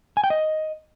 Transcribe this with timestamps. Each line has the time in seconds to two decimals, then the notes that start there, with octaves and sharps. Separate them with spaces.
0.17 G#5
0.24 G5
0.30 D#5